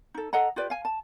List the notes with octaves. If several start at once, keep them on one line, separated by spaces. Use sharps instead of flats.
D#4 A4
A4 D#5 F#5 A#5
F4 G4 B4 D5
F5 G#5
A5